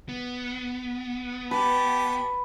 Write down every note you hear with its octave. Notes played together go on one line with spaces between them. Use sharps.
B3
G4 B4 A5